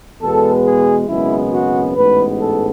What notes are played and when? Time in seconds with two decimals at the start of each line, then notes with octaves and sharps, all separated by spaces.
0.21 E2 B2 G#3 B3 A4
0.65 G#4
1.08 G#1 F#2 C#3 G#3 B3 E4
1.51 F#4
1.95 A1 G#2 G#3 B3 B4
2.39 A4